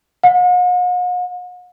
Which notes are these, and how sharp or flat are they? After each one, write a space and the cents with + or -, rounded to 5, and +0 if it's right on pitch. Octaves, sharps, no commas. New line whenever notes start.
F#5 -45